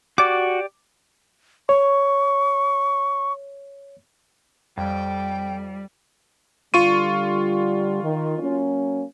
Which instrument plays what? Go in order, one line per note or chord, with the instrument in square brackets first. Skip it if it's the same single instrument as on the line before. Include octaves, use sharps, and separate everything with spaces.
[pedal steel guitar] F#4 [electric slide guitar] G4 D5 [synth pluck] D6
[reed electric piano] C#5 [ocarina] C#6
[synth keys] F2 [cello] G3 [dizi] G5
[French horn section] D3 G3 [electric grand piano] F4 C#6 D#7
[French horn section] D#3
F#3 A#3 C#4